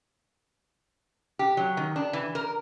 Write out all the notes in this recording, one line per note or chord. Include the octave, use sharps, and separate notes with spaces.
G4
F#3
D#3
D4
E3
A#4